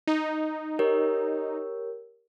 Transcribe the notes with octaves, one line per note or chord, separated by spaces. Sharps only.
D#4
G4 A#4 C#5